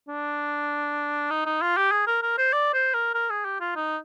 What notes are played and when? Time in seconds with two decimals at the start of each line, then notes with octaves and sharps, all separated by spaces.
0.08 D4
1.31 D#4
1.46 D#4
1.62 F4
1.77 G4
1.91 G#4
2.07 A#4
2.23 A#4
2.38 C5
2.53 D5
2.74 C5
2.94 A#4
3.15 A#4
3.30 G#4
3.45 G4
3.61 F4
3.76 D#4